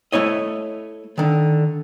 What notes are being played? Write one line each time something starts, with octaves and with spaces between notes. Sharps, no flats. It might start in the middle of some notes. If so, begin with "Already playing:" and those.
A3 E4 C#5 D#5
D3 D#3